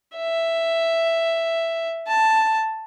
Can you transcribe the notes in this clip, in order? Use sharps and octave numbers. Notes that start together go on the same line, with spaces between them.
E5
A5